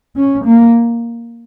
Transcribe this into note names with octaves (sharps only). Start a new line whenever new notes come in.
C#4
A#3